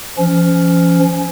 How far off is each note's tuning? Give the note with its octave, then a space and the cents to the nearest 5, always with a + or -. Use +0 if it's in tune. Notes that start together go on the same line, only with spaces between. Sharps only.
F3 -30 C#4 +15